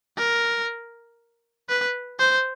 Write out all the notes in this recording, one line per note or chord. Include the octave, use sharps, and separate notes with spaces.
A#4
B4
C5